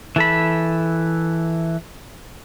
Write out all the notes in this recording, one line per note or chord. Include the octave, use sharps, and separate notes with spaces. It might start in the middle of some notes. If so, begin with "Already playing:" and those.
E3 A4 B5